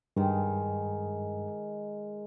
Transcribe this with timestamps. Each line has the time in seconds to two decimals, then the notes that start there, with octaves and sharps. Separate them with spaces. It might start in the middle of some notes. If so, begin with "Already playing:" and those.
0.16 G2 D#3 G#3